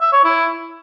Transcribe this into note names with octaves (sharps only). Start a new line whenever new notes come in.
E5
C#5
E4